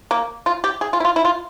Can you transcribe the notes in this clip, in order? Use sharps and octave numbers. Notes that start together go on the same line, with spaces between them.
A#3
F4
G4
G#4
F4
E4
F4
E4
F4